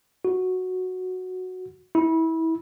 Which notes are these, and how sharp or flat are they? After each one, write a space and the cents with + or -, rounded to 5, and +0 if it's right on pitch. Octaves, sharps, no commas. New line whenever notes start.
F#4 -5
E4 -25